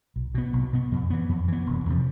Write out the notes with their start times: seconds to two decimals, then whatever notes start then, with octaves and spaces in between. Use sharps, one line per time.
0.16 B1
0.34 B2 B3
0.53 B1
0.73 B2 B3
0.92 F2
1.10 E3 B3
1.29 F2
1.48 E3 B3
1.66 E1
1.86 E2 C3 F3